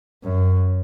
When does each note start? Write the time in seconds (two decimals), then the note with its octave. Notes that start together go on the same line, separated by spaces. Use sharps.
0.23 F#2